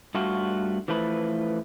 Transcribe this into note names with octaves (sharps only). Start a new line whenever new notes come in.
G2 A3 F4 F#4
E3 F3 A3 B4